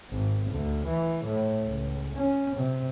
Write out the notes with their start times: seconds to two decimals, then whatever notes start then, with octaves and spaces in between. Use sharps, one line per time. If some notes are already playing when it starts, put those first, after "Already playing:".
0.11 G#1
0.51 D2
0.86 E3
1.25 A2
1.64 C#2
2.15 C#4
2.56 C3